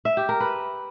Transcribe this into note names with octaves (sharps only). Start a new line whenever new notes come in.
E5
G4
A#4
B4